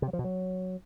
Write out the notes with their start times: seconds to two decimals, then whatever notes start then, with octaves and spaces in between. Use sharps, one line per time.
0.02 C3
0.08 F#3
0.13 F3
0.19 B2
0.24 F#3